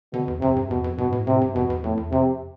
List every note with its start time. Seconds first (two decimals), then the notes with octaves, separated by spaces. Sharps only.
0.13 B2 D3
0.28 E2
0.41 F2 C3
0.56 G2
0.70 E2 B2
0.84 F2
0.98 G2 B2
1.12 A2
1.27 A2 C3
1.41 G2
1.55 F2 B2
1.70 E2
1.84 F2 A2
1.97 E2
2.12 F2 C3